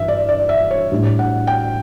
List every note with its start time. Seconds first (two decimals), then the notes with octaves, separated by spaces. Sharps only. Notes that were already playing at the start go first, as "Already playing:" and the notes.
Already playing: G2 E3 E5
0.08 D5
0.29 D5
0.49 E5
0.71 C#5
0.91 A2 G3 D4
1.19 F#5
1.47 G5